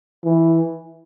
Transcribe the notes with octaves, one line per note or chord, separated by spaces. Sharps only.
E3